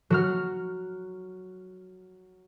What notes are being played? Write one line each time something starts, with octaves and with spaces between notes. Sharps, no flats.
F#3 F#4 F6